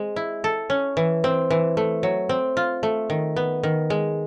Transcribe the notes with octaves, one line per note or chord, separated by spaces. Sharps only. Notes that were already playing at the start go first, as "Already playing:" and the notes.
Already playing: G#3 C4
E4
A4
C#4
E3
C4
E3
A3
F#3
C4
F4
A3
D#3
B3
D#3
G#3